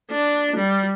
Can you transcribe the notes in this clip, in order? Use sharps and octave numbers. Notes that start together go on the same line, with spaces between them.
D4
G3